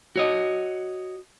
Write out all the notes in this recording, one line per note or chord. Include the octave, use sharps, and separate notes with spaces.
F#4 C#5 D#5